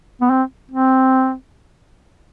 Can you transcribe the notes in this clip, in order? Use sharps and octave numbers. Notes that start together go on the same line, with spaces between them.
B3
C4
C4